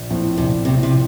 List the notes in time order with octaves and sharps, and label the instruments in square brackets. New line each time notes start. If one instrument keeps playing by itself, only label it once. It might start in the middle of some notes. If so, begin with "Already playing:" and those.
Already playing: [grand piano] A#1
A2 F3 C4 E4
[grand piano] A#1 [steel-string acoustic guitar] C3
[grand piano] A2 F3 C4 E4 [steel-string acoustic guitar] C3
[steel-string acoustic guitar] C3